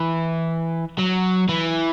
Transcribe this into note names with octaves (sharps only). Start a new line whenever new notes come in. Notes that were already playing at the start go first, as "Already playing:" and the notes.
Already playing: E3
F#3
E3